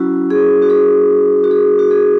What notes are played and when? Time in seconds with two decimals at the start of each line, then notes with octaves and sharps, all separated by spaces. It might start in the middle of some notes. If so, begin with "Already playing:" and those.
Already playing: F#3 C#4 E4 F#4
0.30 G#4
0.62 F#4
0.70 G#4
1.44 F#4
1.51 G#4
1.79 F#4
1.91 G#4